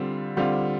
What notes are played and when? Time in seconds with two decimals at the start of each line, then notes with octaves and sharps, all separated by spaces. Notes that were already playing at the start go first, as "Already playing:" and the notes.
Already playing: D3 G3 C4 F4
0.37 D3 G3 C4 F4